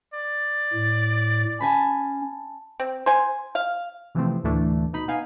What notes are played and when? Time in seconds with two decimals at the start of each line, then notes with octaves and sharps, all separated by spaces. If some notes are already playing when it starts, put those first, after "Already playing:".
0.14 D5
0.73 A2
1.60 C#4 G#5 A5 B5
2.80 C4
3.06 C5 G#5
3.55 F5
4.15 C3 E3 F3 A3 C4
4.44 D2 A2 E3 A3 D4
4.93 B2 D#4 B5
5.08 B3 D#4 F5 G#5